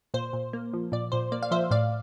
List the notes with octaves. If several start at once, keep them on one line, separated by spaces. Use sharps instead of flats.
A#2 C5
A#2
A#3
F3
A#2 D5
A#2 C5
A#3 D5
F5
F3 C5 E5
A2 D5 F5